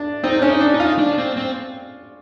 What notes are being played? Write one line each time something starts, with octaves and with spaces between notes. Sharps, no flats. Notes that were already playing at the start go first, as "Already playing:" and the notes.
Already playing: D4
C4 D#4
C#4 D4
D#4
D4
D#4
F4
D4
C4
C4